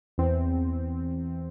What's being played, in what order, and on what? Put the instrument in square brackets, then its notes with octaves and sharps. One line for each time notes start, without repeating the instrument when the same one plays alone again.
[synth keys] E2 C4